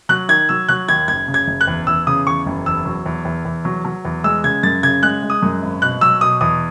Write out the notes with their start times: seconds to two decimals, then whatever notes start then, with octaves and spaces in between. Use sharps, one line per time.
0.09 F#3 F#6
0.29 D#3 G#6
0.49 F#3 E6
0.69 F#3 F#6
0.88 D#2 G#6
1.08 F#1 G#6
1.28 C#3
1.34 G#6
1.47 F#1
1.61 F#6
1.67 E2
1.87 E2 E6
2.07 C#3 D#6
2.27 E2 C#6
2.46 F#1
2.66 E2 E6
2.86 F#3
3.06 E2
3.25 E2
3.45 E2
3.65 F#3
3.85 F#3
4.05 E2
4.24 G#3 E6
4.44 C#3 G#6
4.63 F#2 A6
4.83 C#3 G#6
5.03 G#3 F#6
5.23 G#3
5.30 D#6
5.42 F#2
5.62 G#1
5.82 B2 F#6
6.01 F#3 E6
6.21 B2 D#6
6.41 E2 D#6